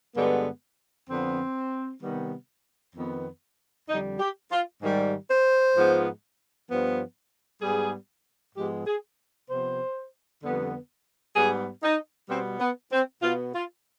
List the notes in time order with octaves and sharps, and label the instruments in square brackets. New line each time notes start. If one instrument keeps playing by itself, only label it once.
[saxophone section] G2 D3 G#3 B3
F2 D3 F3 B3 C4
C3 D#3 G3 B3
F2 D#3 B3
F2 D3 G3 D#4
G4
F4
G#2 D#3 G3
C5
G#2 F3 G#3 B3
G2 F3 B3
G#2 G3 B3 G#4
G#2 F3 G#3 B3 G4
G#4
C3 F3 B3 C5
F2 D3 G3 B3
G#2 G3 B3 G#4
D#4
B2 G3 B3 C4
B3
C4
B2 B3 F4
F4